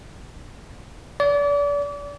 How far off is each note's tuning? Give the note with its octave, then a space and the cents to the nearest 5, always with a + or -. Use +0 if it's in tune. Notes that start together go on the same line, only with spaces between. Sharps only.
D5 -35